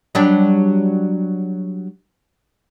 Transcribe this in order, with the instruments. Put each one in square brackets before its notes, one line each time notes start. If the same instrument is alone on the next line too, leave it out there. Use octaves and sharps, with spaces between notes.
[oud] F#3 G3 D4